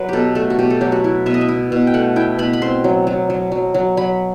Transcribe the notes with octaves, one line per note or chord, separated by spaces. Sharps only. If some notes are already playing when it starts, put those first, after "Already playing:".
Already playing: F#3 B4
B2 G4 A4
A3 A4
F#4
B2 G4
A4
F#3 G4
F#4
E4
B2 E5
D#5
E5
E4
B2
G5
A3 F#5
E4 G5
B2 B5
B5
C4 C6
F#3
F#3
F#3
F#3
F#3
F#3 B5